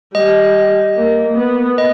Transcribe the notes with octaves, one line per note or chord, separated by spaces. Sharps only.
G3 D#5
A#3
B3
D#5